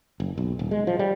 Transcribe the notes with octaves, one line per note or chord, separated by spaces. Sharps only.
F#1
B1
D#1
G#3
F3
G3